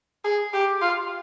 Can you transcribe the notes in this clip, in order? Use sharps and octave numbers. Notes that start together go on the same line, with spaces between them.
G#4
G4
F4